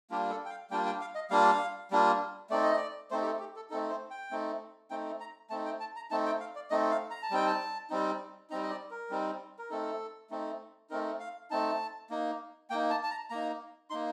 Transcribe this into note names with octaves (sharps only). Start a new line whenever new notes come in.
G3 A#3 D4 F4 G4
A4
G5
F5
G3 A#3 D4 F4 G5
G5
F5
D#5
G3 A#3 D4 F4 F5
G3 A#3 D4 F4
A3 C4 D#4 D5
D#5
D5
A3 C4 D#4 C5
G4
A4
G4
A4
A3 C4 D#4 A4
C5
G5
A3 C4 D#4
A3 C4 D#4 G5
A#5
A3 C4 D#4 A5
G5
A5
A#5
A3 C4 D#4 A5
G5
F5
D5
A3 C4 D#4 D#5
F5
A#5
A5
G3 C4 D#4 G5
A5
G3 C4 D#4
G3 C4 D#4 A#5
D#5
D5
A#4
G3 C4 D#4
A#4
A3 C4 D#4 A4
A3 C4 D#4
A3 C4 D#4 A#4
F5
A3 C4 D#4 A5
A#3 D#4
A#3 D#4 G5
A5
A5
A#5
A#3 D#4 A#5
A#3 D#4 C6